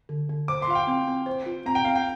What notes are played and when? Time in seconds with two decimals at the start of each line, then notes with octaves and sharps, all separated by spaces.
0.09 D3
0.29 D3
0.48 C5 D6
0.62 C6
0.68 F4 F5
0.75 G5
0.87 C4
1.07 C4
1.26 C5
1.46 F4
1.66 C4 A#5
1.75 G5
1.85 C4 F5
1.95 G5